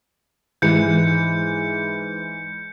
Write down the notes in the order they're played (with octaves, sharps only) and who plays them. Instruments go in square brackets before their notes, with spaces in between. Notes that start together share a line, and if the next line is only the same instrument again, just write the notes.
[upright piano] G#2 E3 [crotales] G6 C#7